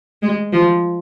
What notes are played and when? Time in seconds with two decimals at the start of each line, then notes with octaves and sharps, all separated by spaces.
0.22 G#3
0.53 F3